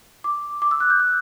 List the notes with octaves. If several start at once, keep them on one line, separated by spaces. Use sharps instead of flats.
D6
D6
E6
F#6
G6
F#6